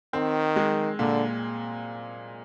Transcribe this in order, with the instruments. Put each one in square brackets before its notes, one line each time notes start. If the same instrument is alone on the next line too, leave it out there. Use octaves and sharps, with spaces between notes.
[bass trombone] D#3 [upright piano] C4
[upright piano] G#3
[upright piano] A#2 [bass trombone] D3